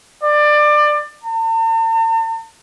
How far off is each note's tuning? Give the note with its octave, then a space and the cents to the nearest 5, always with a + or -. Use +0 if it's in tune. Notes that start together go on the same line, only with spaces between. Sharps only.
D5 +25
A5 +45